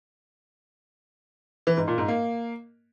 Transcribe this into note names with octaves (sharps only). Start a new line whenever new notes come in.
E3
G#2
A#2
G#2
A#3